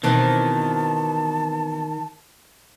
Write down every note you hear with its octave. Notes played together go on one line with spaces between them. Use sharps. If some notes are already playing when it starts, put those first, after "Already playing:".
B2 D#3 E3 C4 A5